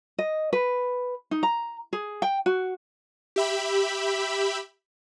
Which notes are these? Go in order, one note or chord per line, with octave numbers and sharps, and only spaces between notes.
D#5
B4
D#4
A#5
G#4
G5
F#4
G4 E5 B5